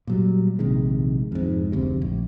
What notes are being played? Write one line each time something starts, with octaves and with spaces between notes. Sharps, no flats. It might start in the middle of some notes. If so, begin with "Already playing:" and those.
A#2 F#3 G3
A#1 C3 D#3 G#3
F2 G#2
F1 D2 C3
A#1